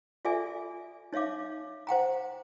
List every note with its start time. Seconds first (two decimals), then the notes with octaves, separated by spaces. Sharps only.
0.25 F4 G#4 A4 D5 E5 G#5
1.13 D#4 C#5 E5 F5 D6
1.87 C5 F#5 G5 A#5